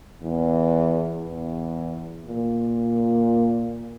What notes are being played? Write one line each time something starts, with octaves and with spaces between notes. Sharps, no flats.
E2
E2
A#2